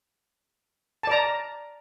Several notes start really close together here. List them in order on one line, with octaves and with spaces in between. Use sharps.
A5 D5 A#5